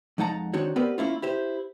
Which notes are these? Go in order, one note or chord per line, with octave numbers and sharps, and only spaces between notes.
F2 G#3 D#4 F#5 A5 A#5
D#3 C4 D4 D#4 F#4 C#5
B3 C4 G4 A#4 B4 D5
A#3 C#4 E4 F4
E4 G4 C5